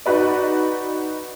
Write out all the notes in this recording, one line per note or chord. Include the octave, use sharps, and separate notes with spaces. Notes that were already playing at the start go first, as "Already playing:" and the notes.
D#4 F#4 B4 D5